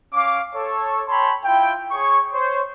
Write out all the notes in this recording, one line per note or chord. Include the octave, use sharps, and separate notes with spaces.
C#4 F5 D6
A4 C#5
C#5 G5 A5 B5 C6
E4 F4 G5
G#4 C#5 C#6
C5 C#5